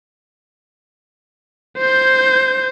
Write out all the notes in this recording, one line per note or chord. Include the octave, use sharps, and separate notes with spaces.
C5 G6